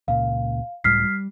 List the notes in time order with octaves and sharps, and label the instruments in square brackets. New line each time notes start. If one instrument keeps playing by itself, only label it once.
[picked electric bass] C#2 A#2 [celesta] F5
[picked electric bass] C#2 A2 G3 [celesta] F6 B6 C7
[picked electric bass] G3